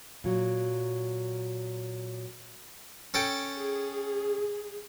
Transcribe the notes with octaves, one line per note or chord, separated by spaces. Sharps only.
A#2 F#3
C#4 A4 G5
G#4